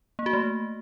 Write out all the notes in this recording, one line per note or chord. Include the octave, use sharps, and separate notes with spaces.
A#3
F#4
A3